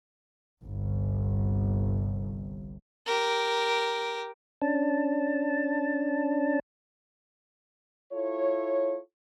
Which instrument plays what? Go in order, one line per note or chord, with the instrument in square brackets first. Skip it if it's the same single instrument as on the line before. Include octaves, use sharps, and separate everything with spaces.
[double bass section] G1 C2
[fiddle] G4 A#4
[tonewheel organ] C#4 D4 A5
[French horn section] E4 F4 A4 C#5